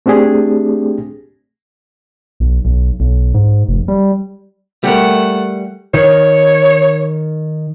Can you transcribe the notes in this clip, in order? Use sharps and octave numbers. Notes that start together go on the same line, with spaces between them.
A3 C4 D4 G4 G#4
B1
B1
B1
G#2
F1
G3
G3 A3 A#4 F#5
D#3 C#5